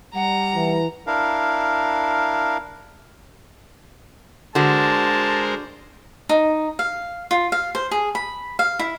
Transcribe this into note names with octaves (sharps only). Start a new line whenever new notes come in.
G3 F#5 A#5
E3
D4 E4 A#4 F5
D3 G#3 F#4 A#4 C5 A5
D#4
F5
F4
F5
C5
G#4
B5
F5
E4